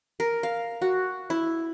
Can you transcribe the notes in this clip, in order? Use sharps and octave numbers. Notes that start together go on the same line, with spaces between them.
A#4
F5
F#4
E4